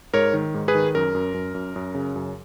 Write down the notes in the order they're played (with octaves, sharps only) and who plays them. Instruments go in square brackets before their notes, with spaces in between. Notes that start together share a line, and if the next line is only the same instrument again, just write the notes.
[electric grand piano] G#2 A#4 C#5
D#3
G#2
G#4 B4
D#3
F#2 A#4
F#2
F#2
F#2
F#2
C#3
F#2